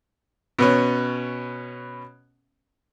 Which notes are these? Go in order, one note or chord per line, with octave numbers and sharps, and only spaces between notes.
B2 B3 C#4